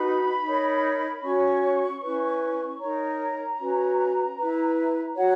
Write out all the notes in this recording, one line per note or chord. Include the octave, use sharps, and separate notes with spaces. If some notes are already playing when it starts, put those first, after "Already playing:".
Already playing: D#4 F#4 B4 B5
D#4 A#4 C#5
C#4 F#4 C#5 C#6
C#4 E4 B4
D#4 A#4 C#5 A#5
C#4 F#4 B4
E4 B4
F#4 C#5 F#5